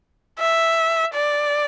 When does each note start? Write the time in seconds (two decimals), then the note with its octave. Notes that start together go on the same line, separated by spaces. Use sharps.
0.39 E5
1.14 D5